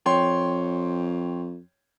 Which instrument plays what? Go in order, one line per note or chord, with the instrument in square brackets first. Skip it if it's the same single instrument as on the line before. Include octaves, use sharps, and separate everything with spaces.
[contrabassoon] F2 [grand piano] C#5 G5 C6